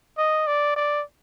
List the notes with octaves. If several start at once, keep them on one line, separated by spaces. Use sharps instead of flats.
D#5
D5
D5